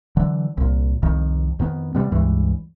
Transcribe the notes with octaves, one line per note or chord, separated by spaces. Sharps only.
D3 E3 F#3
C2 A#2
C2 F2 D#3 F3
F2 D#3 B3
C3 G3 B3
C#2 G2 E3 G#3